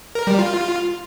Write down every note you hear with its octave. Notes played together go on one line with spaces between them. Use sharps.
A#4
G3
F4